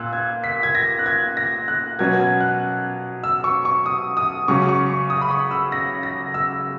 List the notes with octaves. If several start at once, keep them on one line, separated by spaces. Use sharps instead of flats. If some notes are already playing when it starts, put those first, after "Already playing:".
Already playing: A#2 E6 F#6
G#6
B6
G#6
A#6
F#6
G#6
A#6
F#6
B2 F#3 C#4 G#6
G#6
F#6
E6
C#6
C#6
D#6
D#6
C#3 F#3 C#4 C#6
C#6
C#6
D#6
B5
C#6
E6
A#6
A#6
E6